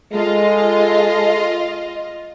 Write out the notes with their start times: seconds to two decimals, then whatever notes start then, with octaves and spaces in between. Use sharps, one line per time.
0.14 G#3 F4 A4 D#5